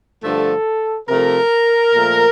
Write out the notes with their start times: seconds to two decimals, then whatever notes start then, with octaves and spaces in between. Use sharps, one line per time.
0.23 G2 D3 F3 A3 A4
1.09 C3 F3 A3 A#4
1.94 A#2 F3 A3